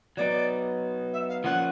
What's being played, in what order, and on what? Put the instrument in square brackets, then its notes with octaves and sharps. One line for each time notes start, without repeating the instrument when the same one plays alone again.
[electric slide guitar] F#3 B3 D#4 [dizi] D5
[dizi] E5
F5
[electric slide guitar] F3 A#3 C#4 F4 [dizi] F#5